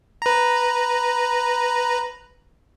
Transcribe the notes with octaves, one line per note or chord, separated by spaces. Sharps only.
B4 A#5